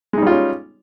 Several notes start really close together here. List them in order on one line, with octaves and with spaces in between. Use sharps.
G#3 D#4 G3 F4 C#4